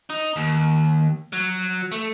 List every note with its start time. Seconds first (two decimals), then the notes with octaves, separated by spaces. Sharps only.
0.10 D#4
0.36 D#2
1.33 F#3
1.92 A3